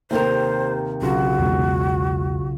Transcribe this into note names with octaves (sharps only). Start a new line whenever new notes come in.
D#2 C3 A#4 C5
B1 C#3 F4 F#4
E2 B2 G#3